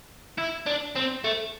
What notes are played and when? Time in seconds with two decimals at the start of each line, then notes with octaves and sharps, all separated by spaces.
0.38 E4
0.67 D4
0.96 C4
1.24 A3